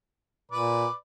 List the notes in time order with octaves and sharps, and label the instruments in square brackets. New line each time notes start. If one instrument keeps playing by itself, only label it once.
[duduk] A#2 [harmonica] B4 D5